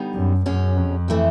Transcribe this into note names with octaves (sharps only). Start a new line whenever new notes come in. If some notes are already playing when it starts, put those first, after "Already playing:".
Already playing: D3 G3 B3 D#4
F#2
F#2 B2 G#3 C#4
F2
E3 A3 C4